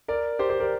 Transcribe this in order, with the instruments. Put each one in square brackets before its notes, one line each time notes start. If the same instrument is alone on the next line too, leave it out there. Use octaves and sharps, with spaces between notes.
[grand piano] A#4 D5
G4 C5
G4 C5
A#4 D5